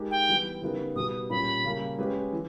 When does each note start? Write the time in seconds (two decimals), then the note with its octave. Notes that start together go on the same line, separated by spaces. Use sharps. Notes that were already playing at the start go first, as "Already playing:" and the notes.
Already playing: G#3 D#4 G4 A#4
0.11 G5
0.28 E3 G3 B3
0.62 C#3 G3 B3 D#4 A#4
0.96 B2 G3 B3 G4 D#6
1.30 A#2 G3 C#4 B5
1.64 C#3 G3 A#3
1.98 G#3 C#4 G4 B4
2.33 E3